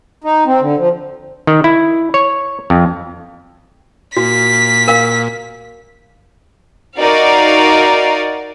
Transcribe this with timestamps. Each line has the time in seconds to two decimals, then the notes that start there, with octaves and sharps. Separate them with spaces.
0.24 D#4
0.46 C4
0.61 D3
0.78 F3
1.47 D#3
1.64 E4
2.14 C#5
2.70 F2
4.17 A#2 F#4 B6
4.88 A#4 F5
7.00 D#4 F#4 A#4 D5 F5